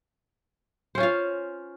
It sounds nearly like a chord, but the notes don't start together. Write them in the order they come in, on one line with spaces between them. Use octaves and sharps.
C5 C#4 F4 F5